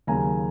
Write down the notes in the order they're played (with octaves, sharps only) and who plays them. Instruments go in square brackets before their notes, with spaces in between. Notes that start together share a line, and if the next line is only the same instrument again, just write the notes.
[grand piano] D#2 C#3 F#3 G#5 A#5